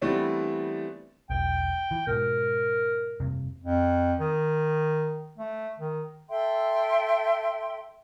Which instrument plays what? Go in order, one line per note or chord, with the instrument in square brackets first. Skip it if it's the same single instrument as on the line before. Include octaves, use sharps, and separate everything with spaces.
[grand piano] E3 G3 A3 B3 C4 D4
[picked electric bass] E1 B1 [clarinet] G5
[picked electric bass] E3
[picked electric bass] G#2 B2 [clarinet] A#4
[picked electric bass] F1 G2 C3
[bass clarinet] F2
D#3
A3
D#3
[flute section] A4 E5 G5 C6